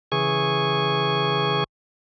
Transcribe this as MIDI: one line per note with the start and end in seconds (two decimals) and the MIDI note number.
0.12 1.64 49
0.12 1.64 52
0.12 1.64 68
0.12 1.64 80
0.12 1.64 85